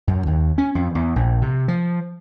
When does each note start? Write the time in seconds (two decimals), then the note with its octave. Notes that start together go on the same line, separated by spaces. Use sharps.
0.07 F#2
0.27 D#2
0.58 C#4
0.75 F2
0.95 E2
1.16 A#1
1.42 C3
1.68 F3